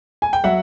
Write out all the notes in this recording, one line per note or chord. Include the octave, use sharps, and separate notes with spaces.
G#5
G5
F#3 E5 F#5